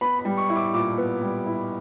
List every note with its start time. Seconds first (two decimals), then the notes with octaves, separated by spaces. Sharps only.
0.01 B3 B5
0.19 B5
0.25 G3
0.37 C#6
0.49 E4
0.56 D6
0.74 A#2 D6
0.98 B3
1.22 G3
1.46 E4